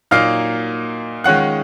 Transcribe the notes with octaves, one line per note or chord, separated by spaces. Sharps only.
A#2 F#3 A#3 D#4 F5 F6
D#3 G#3 C#4 F4 F#5 F#6